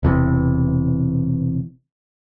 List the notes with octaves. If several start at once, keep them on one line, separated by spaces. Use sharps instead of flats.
E1 E2 C3